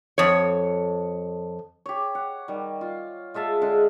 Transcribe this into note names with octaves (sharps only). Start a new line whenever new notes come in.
F2 C#5
G4 C#5
F#5
D#3 G3
F4
G#3 F4 E5 A5
D3 G#3